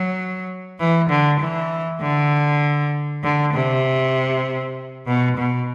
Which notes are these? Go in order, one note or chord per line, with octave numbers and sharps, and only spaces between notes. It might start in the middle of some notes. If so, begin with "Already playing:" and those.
Already playing: F#3
E3
D3
E3
D3
D3
C3
B2
B2